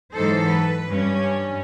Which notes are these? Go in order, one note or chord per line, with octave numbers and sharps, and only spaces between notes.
G#2 E3 F#3 D#4 A4 C5
B4
G2 C#4